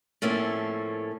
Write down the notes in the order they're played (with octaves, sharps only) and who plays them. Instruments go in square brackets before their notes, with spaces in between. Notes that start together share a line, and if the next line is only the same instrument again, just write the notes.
[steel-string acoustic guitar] A2 F3 A3 A#3 C4 C#4